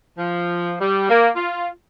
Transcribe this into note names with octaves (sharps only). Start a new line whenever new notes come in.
F3
G3
A#3
F4